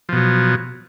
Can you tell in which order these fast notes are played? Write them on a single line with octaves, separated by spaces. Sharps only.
F3 B2 F#3